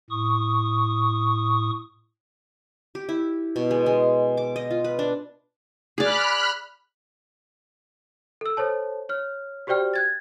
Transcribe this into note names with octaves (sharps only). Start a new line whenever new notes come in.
A2 C#6 D#6
G4
E4
B2
G#3
G#3
D6
D#5
F4
B4
D4
G#4 D5 B5 F6 F#6
A4 E6
A4 C5 C#5 A5
C#5 F6
F#4 G4 C5 D5 G5 F6
F#6 G#6 A6